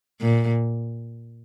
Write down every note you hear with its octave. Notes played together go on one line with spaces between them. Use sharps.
A#2